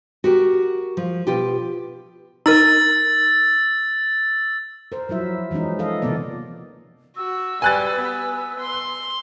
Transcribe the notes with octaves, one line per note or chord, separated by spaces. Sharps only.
F#4 G4 A#4
F3
B2 F4 G4
D#4 A#4 E6 A6
A#4 C5
F3 F#3 E4 E5
E3 F3 G#3 C#4 D#4
A4 D#5 F5
C3 E3 F3 A#3 B3 D5
F#4 E6
G3 B4 G#5 F#6 A6
B3
C6